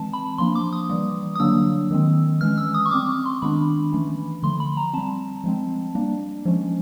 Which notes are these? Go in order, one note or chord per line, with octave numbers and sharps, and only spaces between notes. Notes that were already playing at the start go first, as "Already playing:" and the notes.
Already playing: E3 G#3 C4 A5
B5
F3 A#3 D4 C6
D6
D#6
E3 G3 A#3
D#6
D3 F#3 A#3 D4 E6
D#3 G#3 C4
E3 G#3 C#4 F6
E6
D#6
C#6
G3 C4 D6
C#6
C6
D#3 G#3 B3 D4 B5
E3 A3 C#4
D3 F3 A3 C6
B5
A#5
G3 C4 A5
F3 G#3 C4
G3 A#3 D4
F3 G#3 C#4